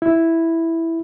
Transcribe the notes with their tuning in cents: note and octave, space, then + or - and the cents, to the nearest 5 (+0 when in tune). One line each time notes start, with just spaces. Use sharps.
E4 +0